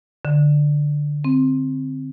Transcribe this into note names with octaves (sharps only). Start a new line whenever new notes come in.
D3
C4